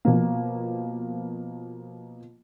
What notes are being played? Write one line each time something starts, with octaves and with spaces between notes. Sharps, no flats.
B2 F3 A#3